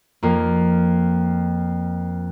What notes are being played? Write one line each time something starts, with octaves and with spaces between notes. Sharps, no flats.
F2 A#3